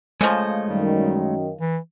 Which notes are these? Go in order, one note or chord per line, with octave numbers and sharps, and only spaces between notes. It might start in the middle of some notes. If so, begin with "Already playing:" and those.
C#3 F3 G#3 A3 D#5
F#2 D#3 G3
E3